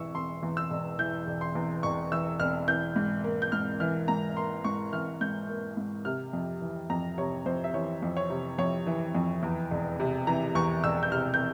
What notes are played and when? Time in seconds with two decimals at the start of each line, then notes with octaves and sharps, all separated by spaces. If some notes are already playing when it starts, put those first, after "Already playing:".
Already playing: E1 E3 C#6 E6
0.15 E1 C6
0.43 E2
0.57 E6
0.71 E1
0.99 E3 G6
1.27 E1
1.41 C6
1.55 E2
1.83 E1 C#6
2.12 E3 E6
2.40 E1 F6
2.68 E3 G6
2.96 G#2
3.24 A#3
3.42 G6
3.52 G#2 F6
3.80 E3 F6
4.08 G#2 A#5
4.36 A#3 C6
4.65 G#2 C#6
4.93 E3 F6
5.21 G#2 G6
5.49 A#3
5.77 G#2
6.05 C3 F6
6.33 F2
6.61 E3
6.90 F2 A#5
7.18 C3 C#5
7.46 F2 C5
7.64 E5
7.74 E3 C#5
8.03 F2
8.17 C#5
8.30 C3
8.58 F2 C#5
8.87 E3
9.15 F2
9.43 E2
9.71 E1
10.00 C3
10.27 E3 A#5
10.55 E2 C#6
10.84 E1 E6
11.03 G6
11.12 C3 F6
11.34 G6